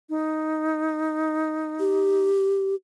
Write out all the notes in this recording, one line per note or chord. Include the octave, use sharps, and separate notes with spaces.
D#4
G4